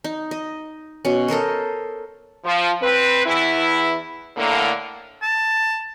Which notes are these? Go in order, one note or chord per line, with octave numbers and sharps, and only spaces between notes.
D#4
D#5
B2 C#4
A4 A#4 C5 D#5
F3
C4 B4
E2 E3 E4
A2 D3 A#3
A5